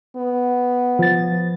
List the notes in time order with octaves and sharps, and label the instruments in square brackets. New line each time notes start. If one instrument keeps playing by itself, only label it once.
[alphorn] B3
[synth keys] F3 A6